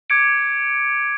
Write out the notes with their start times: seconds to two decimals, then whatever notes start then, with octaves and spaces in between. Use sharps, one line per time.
0.10 D6 G#6 C#7 D7